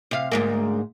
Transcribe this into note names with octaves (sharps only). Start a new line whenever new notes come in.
C3 F5
D2 G#2 A#3